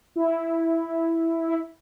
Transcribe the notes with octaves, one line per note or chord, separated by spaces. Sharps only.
E4
E4